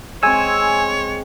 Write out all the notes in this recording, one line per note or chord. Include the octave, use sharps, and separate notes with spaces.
G#3 C4 C#5 G#5 E6